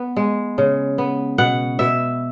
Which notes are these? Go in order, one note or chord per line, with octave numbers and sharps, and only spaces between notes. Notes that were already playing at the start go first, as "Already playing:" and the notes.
Already playing: B3
G#3
C#3
B3
B2 F#5
B2 E5